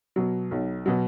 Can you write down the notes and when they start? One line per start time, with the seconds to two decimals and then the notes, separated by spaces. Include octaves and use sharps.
0.16 B2 F#3
0.51 B1
0.86 B2 F#3